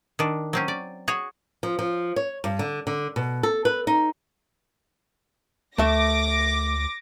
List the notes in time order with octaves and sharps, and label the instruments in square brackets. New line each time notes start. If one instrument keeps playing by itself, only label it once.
[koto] D#3 D4
F#3 C4 C#4
D5
F#4 G#4 C#5
[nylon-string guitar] F3
F3
C#5
G2
D3
D3
B2
A4
B4
D#4
[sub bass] D2 [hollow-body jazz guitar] A3 E5 [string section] D6 A#6